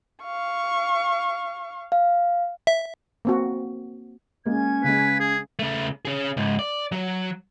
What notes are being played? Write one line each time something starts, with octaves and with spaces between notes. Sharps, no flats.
F5 C#6
F5
E5
A#3 C4 F#4
G#3 A#3 C#4 G#6
C#3 G#3 B4
G#4
C#3 A3
C#4 G#4
C#2 G#2
D5
F#3